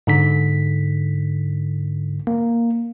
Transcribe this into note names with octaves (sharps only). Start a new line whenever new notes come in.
G#2 D3 B6
A#3